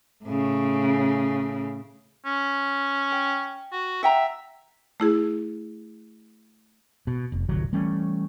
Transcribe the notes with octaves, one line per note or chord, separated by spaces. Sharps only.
A2 C#3
C#4
G5
F#4
E5 F#5 G5 A#5
A3 E4 G#4
B2
F1
D1 G1 C2 F#3
E3 G3 A3 C#4